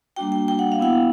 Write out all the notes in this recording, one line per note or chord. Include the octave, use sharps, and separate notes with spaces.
G3 A#3 D4 F#4 G5
G5
G5
F#5
F5
B3 E4 F#5